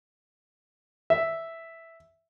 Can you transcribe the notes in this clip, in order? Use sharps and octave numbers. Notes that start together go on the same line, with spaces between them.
E5